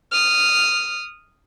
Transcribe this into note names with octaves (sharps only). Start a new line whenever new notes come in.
D#6 F6